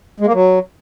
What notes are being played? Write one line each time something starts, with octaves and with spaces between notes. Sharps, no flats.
G#3
A#3
F#3